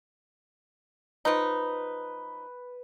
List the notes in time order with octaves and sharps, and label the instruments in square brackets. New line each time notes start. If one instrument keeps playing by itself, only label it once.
[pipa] F3 D#4 [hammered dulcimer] B4